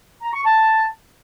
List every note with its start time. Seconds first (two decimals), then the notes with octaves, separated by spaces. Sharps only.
0.22 A#5
0.34 C#6
0.45 A5